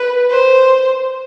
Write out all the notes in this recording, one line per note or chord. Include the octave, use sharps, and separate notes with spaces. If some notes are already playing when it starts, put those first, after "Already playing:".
Already playing: B4
C5